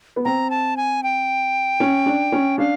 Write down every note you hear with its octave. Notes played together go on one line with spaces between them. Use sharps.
B3
C4 A#5
A5
G#5
G5
C#4
D4
C#4
D4 F5